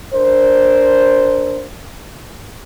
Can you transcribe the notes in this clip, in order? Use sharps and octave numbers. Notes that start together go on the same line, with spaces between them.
D4 A#4 C5